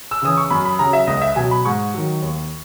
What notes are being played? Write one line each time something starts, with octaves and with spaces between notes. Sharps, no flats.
E6
C#3 E3 D#6
C#6
F#2 B5
B5
C#3 F#3 A#5
E5
C#2 D#5
E5
B2 F#3 G#5
B5
G#2 C#6
D#3 F#3
D#2